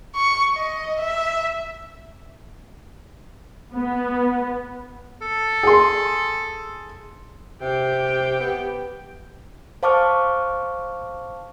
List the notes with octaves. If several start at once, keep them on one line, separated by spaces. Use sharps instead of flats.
C#6
D#5
E5
B3
A4
G#4 C6
C3 G4 G5
B3
C5 F5 A5 C#6 D6 F6